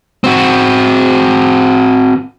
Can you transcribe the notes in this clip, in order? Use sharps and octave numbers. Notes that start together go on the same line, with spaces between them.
C4 F#4